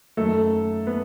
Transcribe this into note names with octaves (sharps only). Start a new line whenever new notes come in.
F#2 D#3 F#3 A3 A4
B3